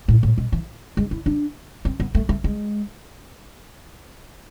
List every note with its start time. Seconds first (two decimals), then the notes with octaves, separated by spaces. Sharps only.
0.08 A2
0.23 A2
0.38 B2
0.52 E3
0.97 G#3
1.11 E4
1.26 D4
1.85 C4
2.00 B3
2.15 A3
2.29 A3
2.44 G#3